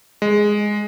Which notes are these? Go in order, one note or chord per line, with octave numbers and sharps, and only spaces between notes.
G#3